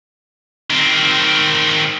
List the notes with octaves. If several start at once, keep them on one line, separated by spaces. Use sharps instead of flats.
D#3 C4